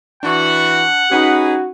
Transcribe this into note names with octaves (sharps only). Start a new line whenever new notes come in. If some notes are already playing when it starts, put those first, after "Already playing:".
E3 D4 F#4 F#5
C#4 D#4 F#4 G#4 B4 B5